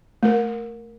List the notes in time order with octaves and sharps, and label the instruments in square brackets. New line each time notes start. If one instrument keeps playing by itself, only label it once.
[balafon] A3 A#4